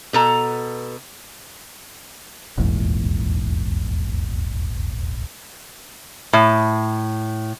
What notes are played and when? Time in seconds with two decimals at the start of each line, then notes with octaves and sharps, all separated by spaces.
0.13 B2 A4 A#5
2.57 D#1 A#1 E2 G#2
6.33 A2